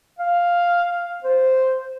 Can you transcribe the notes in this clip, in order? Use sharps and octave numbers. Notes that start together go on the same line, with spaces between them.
F5
C5